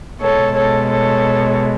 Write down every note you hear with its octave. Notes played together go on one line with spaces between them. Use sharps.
B2 G#3 A4 C#5
A4 C#5
A4 C#5